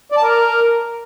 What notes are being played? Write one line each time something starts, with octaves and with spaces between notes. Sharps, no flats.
D5
A5
A#4